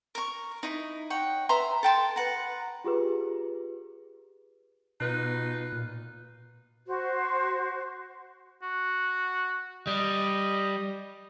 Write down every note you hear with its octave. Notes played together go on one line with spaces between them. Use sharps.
A#4 C#6
D#4 E4
C#5 F#5 G5
B4 E5 A#5 C6
A4 G5 A5 C6
B4 F#5 A#5
F4 G4 G#4 B4
B2 D#4 F4 B4
A#2
F#4 C5
F#4
G3 D#5